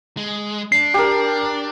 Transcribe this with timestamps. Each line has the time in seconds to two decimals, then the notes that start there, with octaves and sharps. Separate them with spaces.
0.17 G#3
0.72 D4 C7
0.94 G4 A#4